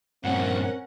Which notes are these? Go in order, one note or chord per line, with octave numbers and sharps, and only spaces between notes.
G2 A#2 C4 C#4 A#4 F#5